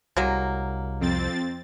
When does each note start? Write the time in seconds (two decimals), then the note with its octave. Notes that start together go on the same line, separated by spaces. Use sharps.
0.17 C2 F#3 G#3 A#3
1.00 F2 C4 A6